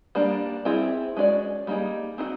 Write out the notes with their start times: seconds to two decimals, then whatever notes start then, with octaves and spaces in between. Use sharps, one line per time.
0.15 G3 A#3 D4
0.65 G3 C4 E4 G#4
1.17 G#3 C#4 F#4 A#4 D5
1.67 G3 A#3 D#4 G#4
2.18 C4 D#4 F#4